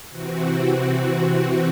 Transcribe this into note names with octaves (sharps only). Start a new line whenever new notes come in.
C3 E3 C4 F#4